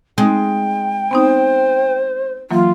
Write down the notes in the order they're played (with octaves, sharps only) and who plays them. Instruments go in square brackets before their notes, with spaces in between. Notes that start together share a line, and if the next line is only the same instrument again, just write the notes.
[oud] G#3 [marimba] C4 D#4 [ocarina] G5
[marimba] B3 C4 D#4 [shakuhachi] C5
[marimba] E3 F#3 A#3 [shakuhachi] F4